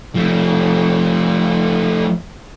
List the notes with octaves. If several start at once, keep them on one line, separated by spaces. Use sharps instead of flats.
F3 A3